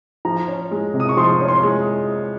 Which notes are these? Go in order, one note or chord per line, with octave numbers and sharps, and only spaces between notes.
F3 A#5
C#4
G#3
C3
D#6
C#6
F3 C6
C#4
C6
G#3